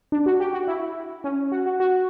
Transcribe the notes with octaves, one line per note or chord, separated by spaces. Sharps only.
D4
F#4
G4
F#4
E4
C#4
F#4
F#4
F#4